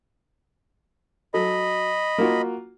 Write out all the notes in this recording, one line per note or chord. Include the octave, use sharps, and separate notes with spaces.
F#3 A4 D#5 B5
A#3 F4 F#4